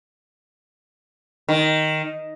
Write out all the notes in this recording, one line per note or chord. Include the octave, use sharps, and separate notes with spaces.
D#3